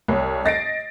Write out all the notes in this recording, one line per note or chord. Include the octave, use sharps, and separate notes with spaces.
C2 C#5
D#5 A6 A#6 C7 D7